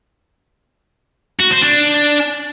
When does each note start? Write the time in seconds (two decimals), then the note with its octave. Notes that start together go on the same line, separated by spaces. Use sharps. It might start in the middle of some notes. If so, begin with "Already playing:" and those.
1.40 F#4
1.51 C5
1.62 D4